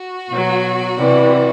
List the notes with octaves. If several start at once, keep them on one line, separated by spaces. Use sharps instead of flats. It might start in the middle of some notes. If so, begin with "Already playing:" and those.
Already playing: F#4
B2 F#3
C3 E3 G3